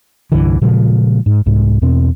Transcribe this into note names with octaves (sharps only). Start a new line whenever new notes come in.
C2 G2 D3 E3
A#2 C#3 F3 G#3
G#2
C2 G#2
E2 B2 C4